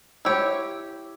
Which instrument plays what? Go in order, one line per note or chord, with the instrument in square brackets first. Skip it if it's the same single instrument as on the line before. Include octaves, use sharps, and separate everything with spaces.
[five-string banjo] E4 G4 C#5 [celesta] E6